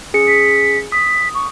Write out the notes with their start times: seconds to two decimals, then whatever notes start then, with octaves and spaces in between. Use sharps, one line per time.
0.14 C#4 G#4 C#7
0.27 B6
0.92 D#6 B6
1.35 C#6